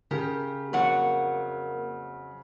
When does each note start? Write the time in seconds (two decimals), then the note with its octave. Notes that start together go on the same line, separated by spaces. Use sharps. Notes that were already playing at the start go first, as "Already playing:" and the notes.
0.11 C#3 G4 A#4
0.73 F2 F#3 A#3 F#5